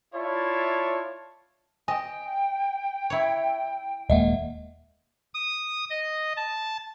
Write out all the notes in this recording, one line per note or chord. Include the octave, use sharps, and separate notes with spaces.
E4 F4 C#5 D5 A5
D#5 G5 G#5
E4 C#5
D#1 G#3 A#3 D#5 E5 F#5
D#6
D#5
A5